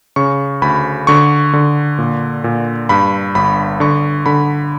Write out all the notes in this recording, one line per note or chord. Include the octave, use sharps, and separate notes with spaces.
C#3 C#6
D2 B5
D3 C#6
D3
A#2
A#2
G2 B5
G1 B5
D3 C#6
D3 B5